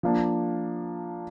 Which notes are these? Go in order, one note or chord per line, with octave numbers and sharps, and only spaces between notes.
F3 A#3 D4